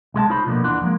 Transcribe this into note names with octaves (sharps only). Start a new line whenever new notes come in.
C2 G#3 F5 A5
D#4 F4 C5 C#5 B5
B2 D3 F3 G#3 A#3 B3
D#2 E3 D4 F#5 C6
F3 G#3 A#3